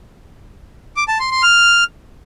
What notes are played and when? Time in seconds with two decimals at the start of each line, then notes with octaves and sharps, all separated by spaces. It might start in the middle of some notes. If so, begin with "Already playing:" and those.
0.97 D6
1.08 A5
1.20 C6
1.31 C6
1.43 F6